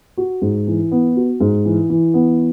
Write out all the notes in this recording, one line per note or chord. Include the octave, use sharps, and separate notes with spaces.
F#4
G#2
E3
B3
F#4
G#2
E3
E3
B3